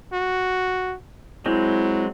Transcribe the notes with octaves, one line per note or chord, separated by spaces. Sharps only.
F#4
F#3 G#3 C4 E4